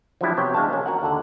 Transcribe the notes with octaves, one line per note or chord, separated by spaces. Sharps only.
F3 F#3 G#3 D4 E4 G4
C3 B3 F#4 C#5 G5
E2 G#3 D4 F5 G5 A5
A#3 C#4
F#4 A#4 F#5
D#2 D3 A4 F#5